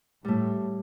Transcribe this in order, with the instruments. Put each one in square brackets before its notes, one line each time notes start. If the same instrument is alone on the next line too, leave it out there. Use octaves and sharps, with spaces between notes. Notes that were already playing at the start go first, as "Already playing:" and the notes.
[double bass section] A2 [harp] G3 A3